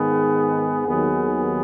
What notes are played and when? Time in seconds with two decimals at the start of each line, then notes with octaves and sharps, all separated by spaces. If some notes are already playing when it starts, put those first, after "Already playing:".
Already playing: G#2 D#3 B3 G#4
0.86 D#2 D#3 F#3 B3